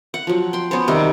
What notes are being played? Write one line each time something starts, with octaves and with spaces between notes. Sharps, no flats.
F#5
F3 F#3
G5 C6
B3 C#4 C5
C3 D#3 G3